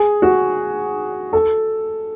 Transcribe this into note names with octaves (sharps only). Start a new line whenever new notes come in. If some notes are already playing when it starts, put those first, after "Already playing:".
Already playing: G#4
F#4
A4